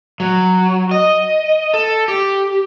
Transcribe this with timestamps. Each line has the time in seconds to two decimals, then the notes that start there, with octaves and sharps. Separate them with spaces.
0.20 F#3
0.91 D#5
1.74 A4
2.08 G4